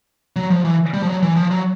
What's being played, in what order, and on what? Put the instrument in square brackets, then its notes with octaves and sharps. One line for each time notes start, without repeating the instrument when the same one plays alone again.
[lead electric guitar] F#3
F3
E3
G3
F3
F#3
E3
F3
F#3